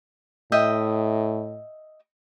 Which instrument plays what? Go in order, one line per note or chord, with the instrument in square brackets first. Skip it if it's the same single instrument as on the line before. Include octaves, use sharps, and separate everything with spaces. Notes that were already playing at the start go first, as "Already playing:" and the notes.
[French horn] A2 [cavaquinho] D#5 E5 G5